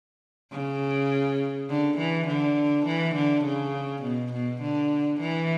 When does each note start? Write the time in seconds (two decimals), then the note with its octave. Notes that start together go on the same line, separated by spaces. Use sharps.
0.52 C#3
1.69 D3
1.98 E3
2.27 D3
2.86 E3
3.15 D3
3.45 C#3
4.03 B2
4.33 B2
4.62 D3
5.20 E3